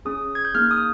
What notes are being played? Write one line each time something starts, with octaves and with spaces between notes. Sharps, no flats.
C#4 G#4 D#6
G#6
G6
A#3 D#4 G#4 F6
D#6